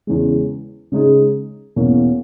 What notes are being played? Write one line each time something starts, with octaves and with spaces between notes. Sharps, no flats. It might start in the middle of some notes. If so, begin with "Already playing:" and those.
E2 C#3 G#3
C#3 G#3 D#4 G#4
E2 B2 F#3 A#3 C#4